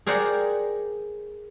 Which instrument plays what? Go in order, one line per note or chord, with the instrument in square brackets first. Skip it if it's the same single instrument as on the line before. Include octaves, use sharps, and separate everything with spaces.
[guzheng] G#4 A#4 C5 D5 F#5 G5